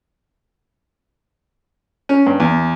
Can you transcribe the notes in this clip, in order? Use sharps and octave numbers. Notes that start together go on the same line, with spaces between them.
C#4
G2
E2